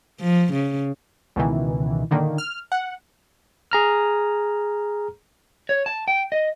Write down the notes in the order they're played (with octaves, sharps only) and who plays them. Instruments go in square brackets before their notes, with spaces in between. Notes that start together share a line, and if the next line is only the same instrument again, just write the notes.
[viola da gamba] F3
C#3
[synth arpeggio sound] C#2 B2 D#3 E3
A#2 D3 D#3 A#3
F6
F#5
[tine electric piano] G#4 A#5 F6
[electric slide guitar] C#5
A5
G5
D#5